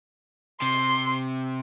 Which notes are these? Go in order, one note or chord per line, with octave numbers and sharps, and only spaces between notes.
C3 C6